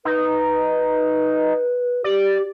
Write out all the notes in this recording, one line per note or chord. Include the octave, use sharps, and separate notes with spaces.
D#4 B4
G4 D5